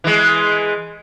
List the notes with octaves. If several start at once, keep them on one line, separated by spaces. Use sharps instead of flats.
E3 G#3